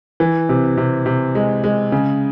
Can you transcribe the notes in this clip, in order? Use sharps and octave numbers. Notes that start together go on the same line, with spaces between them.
E3
C3
C3
C3
G#3
G#3
C#3